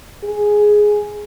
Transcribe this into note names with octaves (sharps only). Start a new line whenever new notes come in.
G#4